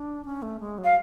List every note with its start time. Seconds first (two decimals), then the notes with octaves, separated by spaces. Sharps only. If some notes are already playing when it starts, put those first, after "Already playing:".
Already playing: D4
0.25 C#4
0.42 A3
0.60 G#3
0.78 F#3
0.84 F5